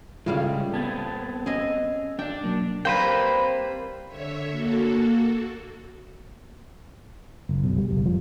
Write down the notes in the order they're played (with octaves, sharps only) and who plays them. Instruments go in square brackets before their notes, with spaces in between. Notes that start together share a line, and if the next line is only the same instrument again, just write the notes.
[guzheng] A2 G3 F5 [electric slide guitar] C#3 G#3 [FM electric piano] F4
[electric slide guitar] B3 C4 [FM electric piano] A5 G#6 A6
[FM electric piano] C#4 E6 [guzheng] G#4 D#5
[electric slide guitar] D4 D5 [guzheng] G5
[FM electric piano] B2 F#3 A#3
[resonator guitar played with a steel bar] G3 A#3 [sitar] C4 [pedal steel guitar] B4 C5 G5
[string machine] D3 C#5 E5
A#3 F#4 A4
[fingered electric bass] F#1
B1
G3
F#1
F3